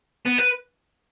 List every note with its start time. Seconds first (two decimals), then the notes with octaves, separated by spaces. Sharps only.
0.26 B3
0.39 B4